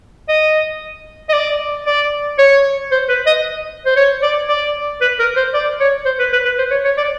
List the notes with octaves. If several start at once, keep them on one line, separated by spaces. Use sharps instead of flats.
D#5
D#5
D5
D5
C#5
C5
B4
D#5
C5
C#5
D5
D5
B4
A#4
C5
D5
C#5
C5
B4
B4
B4
C5
C#5
C#5
D5